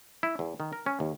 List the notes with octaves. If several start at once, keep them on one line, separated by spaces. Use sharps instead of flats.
E4
E2
D#3
A#4
C#4
D#2